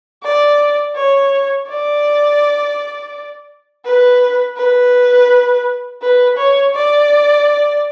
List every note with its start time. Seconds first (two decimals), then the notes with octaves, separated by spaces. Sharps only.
0.23 D5
0.96 C#5
1.69 D5
3.85 B4
4.57 B4
6.02 B4
6.38 C#5
6.75 D5